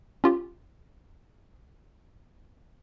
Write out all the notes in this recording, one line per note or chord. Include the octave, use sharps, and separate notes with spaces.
C#4 F4 G4